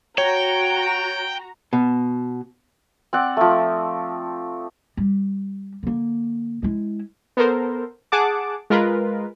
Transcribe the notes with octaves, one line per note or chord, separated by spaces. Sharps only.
F#4 C#5 G5 A#5
B2
C4 D5 F#5
F3 A3
G3
D3 A#3
G#3 E4
B3 A4 A#4 C5
G#4 F#5 A5 D6
G#3 F4 A#4 B4